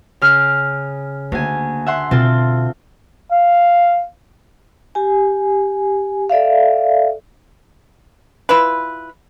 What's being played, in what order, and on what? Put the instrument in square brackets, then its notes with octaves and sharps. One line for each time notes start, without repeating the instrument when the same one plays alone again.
[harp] C#3 F6 G6
[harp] D2 G#5 [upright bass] A#3
[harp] E5 F#5 C6
[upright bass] B2 [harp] C4 F4 A4
[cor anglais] F5
[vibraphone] G4 G#5
A4 D5 E5 F5
[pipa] E4 F4 B4